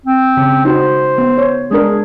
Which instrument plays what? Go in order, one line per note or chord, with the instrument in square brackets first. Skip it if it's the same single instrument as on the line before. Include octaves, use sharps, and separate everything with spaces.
[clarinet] C4
[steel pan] C#3
[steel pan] D#4 F#4 [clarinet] C5
[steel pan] B3
C#5
[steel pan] G#3 D4 A#4 [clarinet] G#4